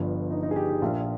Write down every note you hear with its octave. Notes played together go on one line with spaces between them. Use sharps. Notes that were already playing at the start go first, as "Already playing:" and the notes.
Already playing: G1 G2 F3
D#4
D#4
G#4
G4
G4
A#1 A#2 F3 F4